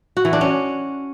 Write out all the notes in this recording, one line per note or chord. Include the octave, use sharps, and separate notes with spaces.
F#4
E3
D4
C#4